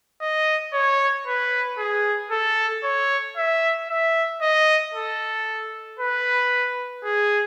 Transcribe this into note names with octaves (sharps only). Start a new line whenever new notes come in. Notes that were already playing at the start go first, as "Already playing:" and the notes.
D#5
C#5
B4
G#4
A4
C#5
E5
E5
D#5
A4
B4
G#4